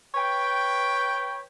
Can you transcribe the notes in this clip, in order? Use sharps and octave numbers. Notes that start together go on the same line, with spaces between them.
B4 C#5 G5